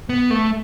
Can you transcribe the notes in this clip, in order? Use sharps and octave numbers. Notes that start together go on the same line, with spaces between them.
B3
A3